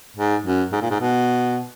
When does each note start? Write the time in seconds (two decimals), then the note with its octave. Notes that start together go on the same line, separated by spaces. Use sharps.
0.17 G#2
0.44 F#2
0.72 G#2
0.81 A#2
0.90 G#2
1.00 B2